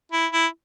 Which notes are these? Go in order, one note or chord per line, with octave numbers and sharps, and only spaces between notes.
E4
E4